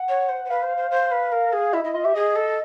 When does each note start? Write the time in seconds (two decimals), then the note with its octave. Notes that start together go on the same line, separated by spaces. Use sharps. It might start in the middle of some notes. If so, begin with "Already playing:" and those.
Already playing: F#5
0.09 C#5
0.29 C5
0.45 C5
0.50 B4 F5
0.63 C5
0.77 C5
0.91 C5
1.12 B4
1.32 A#4
1.53 G#4
1.73 E4 D#5
1.84 E4 D#5
1.94 F4 D#5
2.04 G4 E5
2.14 G#4 D#5
2.36 A4